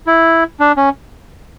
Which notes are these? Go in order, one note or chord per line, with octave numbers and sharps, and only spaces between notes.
E4
D4
C#4